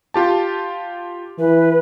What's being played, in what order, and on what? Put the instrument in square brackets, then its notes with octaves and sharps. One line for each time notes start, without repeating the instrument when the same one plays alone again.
[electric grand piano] F4 G4 A5
[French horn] E3 [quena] B4